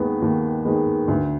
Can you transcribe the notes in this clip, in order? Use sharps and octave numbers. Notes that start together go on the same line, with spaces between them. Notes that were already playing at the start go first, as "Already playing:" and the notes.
Already playing: D#2 D#3 G#3 B3
D#2
D#3 G#3 B3
D2